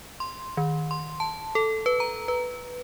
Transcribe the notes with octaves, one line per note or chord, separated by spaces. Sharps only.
C6
D#3
C6
A5
A4
B4
A#5
B4